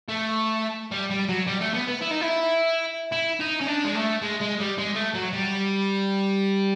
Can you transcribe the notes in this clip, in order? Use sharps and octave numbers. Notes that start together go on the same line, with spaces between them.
A3
G3
G3
F#3
G3
A3
B3
B3
E4
D#4
E4
E4
D#4
C#4
D4
G#3
A3
G#3
G#3
G3
G#3
A3
F#3
G3